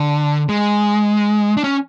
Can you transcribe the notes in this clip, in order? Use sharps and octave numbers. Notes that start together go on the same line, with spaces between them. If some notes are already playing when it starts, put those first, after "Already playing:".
Already playing: D3
G#3
D4
C#4